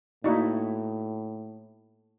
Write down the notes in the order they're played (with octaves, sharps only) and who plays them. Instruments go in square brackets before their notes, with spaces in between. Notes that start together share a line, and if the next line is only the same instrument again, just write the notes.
[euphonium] A2 [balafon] A#3 F#4 D5 [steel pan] D#4 E4